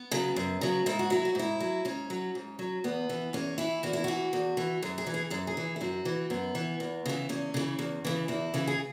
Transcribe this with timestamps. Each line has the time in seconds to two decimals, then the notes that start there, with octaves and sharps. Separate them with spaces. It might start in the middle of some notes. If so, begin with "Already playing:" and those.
Already playing: B3
0.11 C#3 F#3
0.36 F#2
0.61 C#3 F#3
0.86 G#2 E4
0.99 F#4
1.10 F#3 E4
1.25 F#4
1.35 G#2 E4
1.60 F#3
1.85 G#2 C#4
2.10 F#3
2.35 G#2
2.59 F#3
2.84 E2 B3
3.09 E3
3.33 E2 C#4
3.58 E3 E4
3.83 E2 F#4
3.93 E4
4.04 E3 F#4
4.33 E2
4.57 E3
4.82 F#2 G#4
4.98 G#4
5.07 E3
5.14 G#4
5.30 F#2 G#4
5.47 G#4
5.57 E3
5.76 E4
5.81 F#2 F#4
6.05 E3
6.30 F#2 B3
6.55 E3
6.80 E2
7.06 C#3 E3
7.29 E2 C#4
7.54 C#3 E3
7.79 E2
8.05 C#3 E3
8.28 E2 E4
8.54 C#3 E3
8.67 G#4